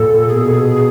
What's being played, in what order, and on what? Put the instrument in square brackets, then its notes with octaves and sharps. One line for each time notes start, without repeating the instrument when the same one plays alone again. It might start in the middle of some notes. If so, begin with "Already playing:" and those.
Already playing: [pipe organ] A#2 [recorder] A4
[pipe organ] B2 [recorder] G#4